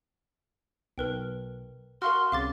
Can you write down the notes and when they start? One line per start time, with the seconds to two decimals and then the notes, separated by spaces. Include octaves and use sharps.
0.98 B1 A#4 B4 G5
2.02 F#4 A#4 F5 C6 F6
2.32 C2 C#3 F5 D6 A6